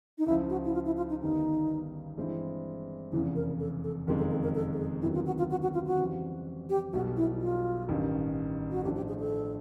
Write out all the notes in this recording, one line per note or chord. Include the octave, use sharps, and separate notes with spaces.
D#4
C#2 C#3 F3 E4
F#4
E4
F4
E4
F4
D#4
G1 G2 D#3 G3 B3 D#4
G2 E3 G#3 C4 E4
F1 E2 C#3 E4
A#4
A4
A4
F#1 F2 C3 D#3 G#3 A#4
A4
A4
A#4
A4
A4
G#4
D2 C3 D#3 F#3 B3 E4
F4
F#4
F4
F#4
F#4
F4
F#4
F2 C#3 E3 G3 C4
G4
B1 B2 G3 F#4
E4
F4
A1 G2 D#3 G3
F#4
A2 F3 A3 D4 G4
G4
G#4
A4